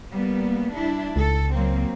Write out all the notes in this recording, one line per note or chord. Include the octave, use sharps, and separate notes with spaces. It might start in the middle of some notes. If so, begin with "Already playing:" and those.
G3 A#3 B3
D4 E4
C#2 A4
F#3 A#3 C4